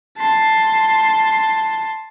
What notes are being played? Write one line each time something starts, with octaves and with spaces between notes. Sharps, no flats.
A5 C6